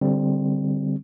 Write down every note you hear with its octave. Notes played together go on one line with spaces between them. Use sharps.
D3 G3 C4